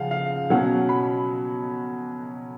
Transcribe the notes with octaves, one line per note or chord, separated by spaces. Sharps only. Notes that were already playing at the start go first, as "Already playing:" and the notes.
Already playing: C#3 F3 F5 F#5
F5
B2 F#3 C#4 F#5
B5